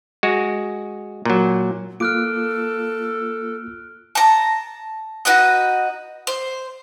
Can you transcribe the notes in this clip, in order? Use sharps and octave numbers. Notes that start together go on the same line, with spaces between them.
G#3 F#4
A#2 F#3
A#3 F4 A4 D6 F6 F#6 D7
A5 A#5
D#4 F#4 B4 D#5
C5